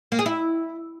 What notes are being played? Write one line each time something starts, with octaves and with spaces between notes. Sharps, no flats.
A#3
G#4
E4